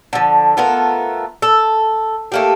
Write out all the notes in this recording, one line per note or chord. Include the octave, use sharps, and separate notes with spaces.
D3 F3
A3 B3 F4 A#4
A4
A3 A#3 G4